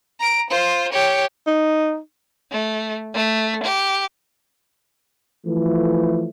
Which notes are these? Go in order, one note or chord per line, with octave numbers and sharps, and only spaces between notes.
A#5 D7
F4 C5
G4 C#5
D#4
A3
A3
G4
E3 F3 A3